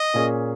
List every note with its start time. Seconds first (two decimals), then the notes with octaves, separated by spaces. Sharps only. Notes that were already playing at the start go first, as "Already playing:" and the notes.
Already playing: D#5
0.14 A#2 A#3 C#4 G#4